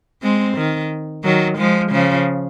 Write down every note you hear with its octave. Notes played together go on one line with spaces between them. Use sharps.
G#3 C4
D#3
D#3 F#3
F3 G#3
C#3 F3